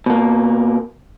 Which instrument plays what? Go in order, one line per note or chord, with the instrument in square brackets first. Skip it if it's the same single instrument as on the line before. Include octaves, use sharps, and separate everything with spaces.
[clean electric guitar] B2 A#3